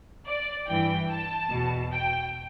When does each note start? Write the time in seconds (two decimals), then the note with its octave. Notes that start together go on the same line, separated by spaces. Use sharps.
0.26 D5
0.68 G2 E3 G5
1.10 A5
1.51 E2 B2
1.92 G5